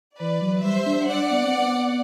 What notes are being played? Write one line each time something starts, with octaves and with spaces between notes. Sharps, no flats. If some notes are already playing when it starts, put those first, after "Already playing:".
E3 B4 D5
F#3
G3 C5 E5
D4
D5 F#5
B3
C4
B3